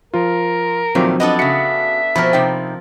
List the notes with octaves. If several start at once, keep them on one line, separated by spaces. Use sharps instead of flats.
F3 F4 A#4
A#2 D#3 F3 F#3 A3 C4
B3 D4 A4 D#5
C#3 F#4 E5 C#7
B2 F3 C4 A#4 B5 F6
C3 D#4 G5